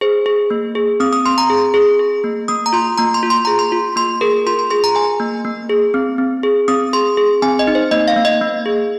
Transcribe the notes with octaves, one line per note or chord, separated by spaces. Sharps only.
G#4 C5
G#4
A#3
G#4
C4 D#6
D#6
C4 C6
A#5
G#4
G#4
G#4
A#3
A#3 D#6
A#5
F4 C6
A#3 A#5
C6
F4
C6
G#4 A#5
C6
F4
A#3 C6
G#4 A#4
F4 C6
C6
G#4 C6
A#5
G#4 G#5
A#3
A#3
G#4
C4
C4
G#4
C4 D#6
G#4 C6
G#4
C4 G#5
D#5
D#4
C5
A#3 D#5
F5
A#3
D#5
A#3
G#4